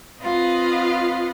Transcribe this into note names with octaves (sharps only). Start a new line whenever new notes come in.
C4 F4 B4 D#5 F5 F#5